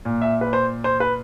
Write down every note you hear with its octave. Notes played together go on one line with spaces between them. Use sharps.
A#2
E5
B4
C5
C5
B4